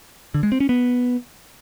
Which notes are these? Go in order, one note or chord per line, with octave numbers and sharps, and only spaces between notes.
D3
G#3
C4
C#4
B3